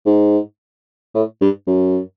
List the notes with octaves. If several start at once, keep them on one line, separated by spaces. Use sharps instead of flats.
G#2
A2
G2
F#2